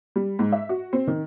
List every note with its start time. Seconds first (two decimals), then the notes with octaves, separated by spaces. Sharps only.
0.16 G3
0.39 G#2
0.52 E5
0.69 F#4
0.93 C4
1.07 D#3